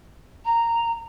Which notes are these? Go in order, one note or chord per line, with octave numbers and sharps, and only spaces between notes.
A#5